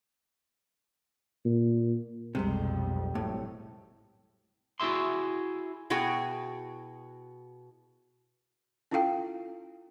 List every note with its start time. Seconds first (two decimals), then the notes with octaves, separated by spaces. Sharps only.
1.45 A#2
2.35 B1 F2 C3 G3 G#3 G4
3.15 G#1 A2 C3 F#3
4.80 E4 F#4 G#4 E5 C6
5.90 B2 E4 F#4 G#4 G5 G#5
8.91 C#4 E4 F4 A4 F5 G5